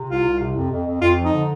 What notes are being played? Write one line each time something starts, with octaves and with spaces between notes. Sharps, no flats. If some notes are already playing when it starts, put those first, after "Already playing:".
Already playing: C3
C2 F4
C2
C3
F2
F2
F2
F2 F4
F3
D#4
D3